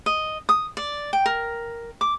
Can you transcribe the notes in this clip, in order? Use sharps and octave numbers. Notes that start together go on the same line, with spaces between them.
D#5
D#6
D5
G5
A#4
D6